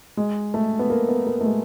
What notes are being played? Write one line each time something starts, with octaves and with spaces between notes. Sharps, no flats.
G#3
A3
B3
A#3
B3
A#3
A3
G#3